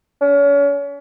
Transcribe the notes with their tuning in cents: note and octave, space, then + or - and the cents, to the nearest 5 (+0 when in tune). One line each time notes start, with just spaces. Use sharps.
C#4 +35